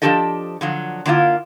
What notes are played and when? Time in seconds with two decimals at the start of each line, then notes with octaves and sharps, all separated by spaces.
0.02 F3 G3 D4 G4 A4 D#5
0.61 D3 F3 F#3
1.06 D3 A#3 E4 F4